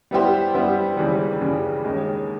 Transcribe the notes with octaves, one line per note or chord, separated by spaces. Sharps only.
G3 B3 E4 G4 C5
G3 B3 E4 G4 C5
D#2 C#3 E3 G3
D#2 C#3 E3 G3
D#2 D#3 G#3 C#4